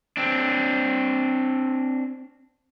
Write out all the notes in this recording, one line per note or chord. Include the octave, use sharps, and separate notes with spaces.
C4 D4